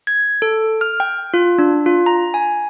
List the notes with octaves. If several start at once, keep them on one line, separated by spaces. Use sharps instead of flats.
G#6
A4
F6
G5
F4
D4
F4
A#5
G#5